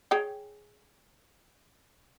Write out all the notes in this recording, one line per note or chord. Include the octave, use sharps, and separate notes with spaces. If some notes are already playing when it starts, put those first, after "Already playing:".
G#4 C#5 G5